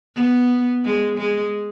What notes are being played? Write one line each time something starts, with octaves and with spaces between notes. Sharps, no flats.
B3
G#3
G#3